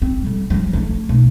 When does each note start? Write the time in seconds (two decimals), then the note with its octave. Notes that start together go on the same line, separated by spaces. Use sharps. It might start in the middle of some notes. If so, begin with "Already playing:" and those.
0.02 C4
0.22 D3 G3
0.50 F3 G3
0.73 D3 A3
1.09 B1